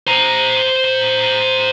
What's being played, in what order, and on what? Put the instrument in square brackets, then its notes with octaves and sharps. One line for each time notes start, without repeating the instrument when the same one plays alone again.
[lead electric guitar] C5 A#5